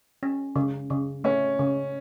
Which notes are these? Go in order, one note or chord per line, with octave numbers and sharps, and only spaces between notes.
C#4
C#3
C#3
A3 C#4
C#3